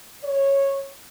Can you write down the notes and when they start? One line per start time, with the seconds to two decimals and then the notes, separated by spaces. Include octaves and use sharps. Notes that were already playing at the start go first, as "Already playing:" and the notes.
0.24 C#5